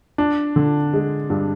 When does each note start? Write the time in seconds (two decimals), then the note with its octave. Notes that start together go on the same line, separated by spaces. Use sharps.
0.18 D4
0.56 D3
0.94 G#3
1.30 G2